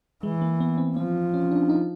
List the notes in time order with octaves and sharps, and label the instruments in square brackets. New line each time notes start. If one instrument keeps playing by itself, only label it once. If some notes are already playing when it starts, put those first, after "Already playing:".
[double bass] E3 [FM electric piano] G#3
[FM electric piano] A#3
B3
C4
[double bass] F3 [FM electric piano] C4
[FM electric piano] C#4
D4
D#4